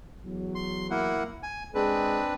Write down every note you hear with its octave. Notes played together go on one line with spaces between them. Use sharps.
E2 F#3
C6
A#3 E4 F#5
G#5
G#3 C4 D4 G#4 B4